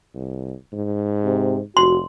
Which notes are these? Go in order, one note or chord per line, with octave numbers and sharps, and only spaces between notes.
C2
G#2
C3
F1 F#4 C6